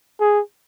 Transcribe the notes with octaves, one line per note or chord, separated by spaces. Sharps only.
G#4